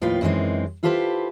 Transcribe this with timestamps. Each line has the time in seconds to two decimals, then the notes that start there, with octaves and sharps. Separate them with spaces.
0.02 D#2 A2 F3 F4 B4 G5
0.21 F#2 D#3 E3 G3 G#3 C4
0.83 E4 F4 G4 A4 B4 C5